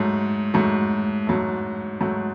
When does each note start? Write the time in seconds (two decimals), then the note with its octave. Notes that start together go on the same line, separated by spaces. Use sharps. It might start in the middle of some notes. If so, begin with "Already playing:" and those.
Already playing: G#2 F#3 A3
0.54 G#2 F#3 A3
1.27 G#2 F#3 A3
2.01 G#2 F#3 A3